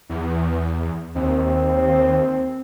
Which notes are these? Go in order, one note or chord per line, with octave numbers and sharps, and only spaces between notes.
E2
D#2 C4